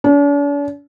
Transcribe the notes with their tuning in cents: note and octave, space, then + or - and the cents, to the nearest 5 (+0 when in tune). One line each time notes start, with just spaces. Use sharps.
D4 -45